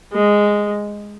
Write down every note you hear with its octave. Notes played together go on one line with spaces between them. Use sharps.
G#3